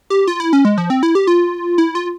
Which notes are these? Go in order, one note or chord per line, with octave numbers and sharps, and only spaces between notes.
G4
F4
E4
C#4
G#3
F3
C4
E4
G4
F4
E4
F4